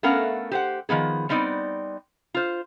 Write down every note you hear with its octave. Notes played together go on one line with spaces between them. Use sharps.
A3 B3 C#4 A#4 F5 F#5
G4 C5 F#5
D#3 F3 B3 G#4
G3 B3 C4 D#4 D5
F4 C5